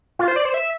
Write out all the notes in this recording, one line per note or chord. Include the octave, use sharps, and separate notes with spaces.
F4
C5
D5
C5
E5